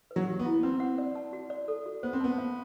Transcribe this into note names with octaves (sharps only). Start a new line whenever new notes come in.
B4
F#3
G4
B3
E4
C4 B4
F#5
D5
A5
F#4
D5
A4
F#4
B3 C5
C4
B3 A5
F5